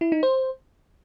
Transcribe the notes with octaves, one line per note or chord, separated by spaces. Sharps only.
E4
D#4
C5